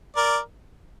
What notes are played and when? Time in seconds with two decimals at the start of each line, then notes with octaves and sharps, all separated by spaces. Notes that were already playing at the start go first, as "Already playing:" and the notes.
0.16 A#4 D5